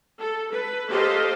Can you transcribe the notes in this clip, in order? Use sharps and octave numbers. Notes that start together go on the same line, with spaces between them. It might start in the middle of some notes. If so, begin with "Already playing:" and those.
A4
B4
A#3 G4 A4 C5 D#5 F5